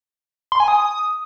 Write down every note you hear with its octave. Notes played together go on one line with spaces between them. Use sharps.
C6
G#5
D#6